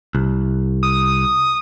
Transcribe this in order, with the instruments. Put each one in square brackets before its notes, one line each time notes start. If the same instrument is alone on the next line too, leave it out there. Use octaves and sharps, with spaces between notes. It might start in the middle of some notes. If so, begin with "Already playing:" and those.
[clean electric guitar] C2
[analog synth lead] D#6